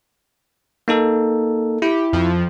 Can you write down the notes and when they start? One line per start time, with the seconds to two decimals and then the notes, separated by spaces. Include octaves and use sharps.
0.88 A#3 D#4 A4
1.82 E4 G4
2.13 F2 F3